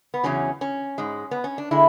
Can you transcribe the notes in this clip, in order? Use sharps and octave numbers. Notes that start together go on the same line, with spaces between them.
B3
E2 C#3 F#3 C#4
C#4
G#2 G#3
B3
C#4
D4
D3 G#3 E4